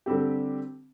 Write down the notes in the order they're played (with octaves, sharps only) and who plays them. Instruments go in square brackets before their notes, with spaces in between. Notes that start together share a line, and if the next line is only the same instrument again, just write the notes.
[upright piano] D3 G3 C4 G4